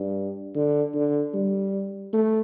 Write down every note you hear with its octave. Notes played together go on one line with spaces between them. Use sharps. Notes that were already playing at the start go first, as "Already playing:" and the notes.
Already playing: G2
D3
D3
G3
A3